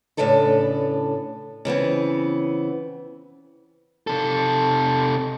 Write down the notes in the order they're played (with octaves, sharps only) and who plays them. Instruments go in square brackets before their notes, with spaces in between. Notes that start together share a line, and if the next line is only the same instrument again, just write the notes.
[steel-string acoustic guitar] A2 C#3 F#3 D4 A4 B4
C#3 E3 B3 C4
[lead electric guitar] C3 A4